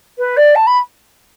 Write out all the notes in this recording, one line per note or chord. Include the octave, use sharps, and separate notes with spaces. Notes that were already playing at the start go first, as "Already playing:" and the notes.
B4
D5
A5
B5